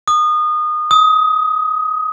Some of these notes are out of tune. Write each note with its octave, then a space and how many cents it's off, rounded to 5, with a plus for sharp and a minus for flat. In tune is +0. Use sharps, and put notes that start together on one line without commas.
D#6 -25
D#6 +25